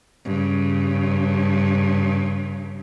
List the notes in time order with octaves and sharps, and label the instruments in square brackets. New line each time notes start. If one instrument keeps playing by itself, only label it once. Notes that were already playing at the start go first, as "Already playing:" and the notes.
[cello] G2 C#3